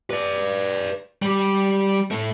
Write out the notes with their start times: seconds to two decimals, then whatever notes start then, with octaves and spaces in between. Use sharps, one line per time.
0.10 B4 D5
1.22 G3 G4
2.11 A2 A3